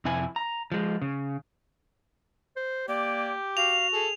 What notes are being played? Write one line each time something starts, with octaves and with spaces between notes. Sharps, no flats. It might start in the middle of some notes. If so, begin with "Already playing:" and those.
F2 C3 E4 G#5
A#5
F3 G#3
C#3
C5
A#3 G4 D5
F#4 F5 F7
G#4 A4